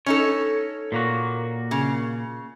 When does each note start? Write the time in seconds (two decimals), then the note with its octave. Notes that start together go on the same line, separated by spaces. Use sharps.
0.06 C#4 D#4 A4 C#5
0.92 A#2 A#3 F#4
1.71 C#3